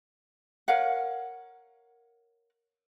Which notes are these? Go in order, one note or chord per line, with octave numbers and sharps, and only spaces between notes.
A#4 C#5 F5 F#5